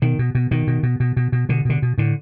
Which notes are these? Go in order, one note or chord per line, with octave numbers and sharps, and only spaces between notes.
B2 D#3
B2
B2
B2 D#3
B2
B2
B2
B2
B2
B2 D3
B2 D3
B2
A2 D3